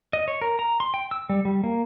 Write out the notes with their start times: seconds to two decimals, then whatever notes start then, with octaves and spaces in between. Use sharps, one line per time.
0.13 D#5
0.28 C#5
0.42 A#4
0.59 A#5
0.80 C6
0.94 G5
1.11 E6
1.29 G3
1.45 G3
1.64 A#3